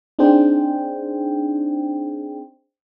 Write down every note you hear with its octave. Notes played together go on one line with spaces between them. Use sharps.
C4 D4 D#4 G#4 C5 G5